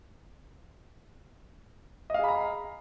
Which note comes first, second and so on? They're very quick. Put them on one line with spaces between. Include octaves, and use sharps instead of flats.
D#5 F5 G#4 B5 A#5